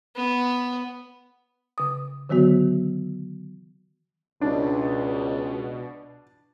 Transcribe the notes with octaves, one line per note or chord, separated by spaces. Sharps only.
B3
C#3 D#6
D3 D#3 F#3 B3 F#4
C#2 B2 D4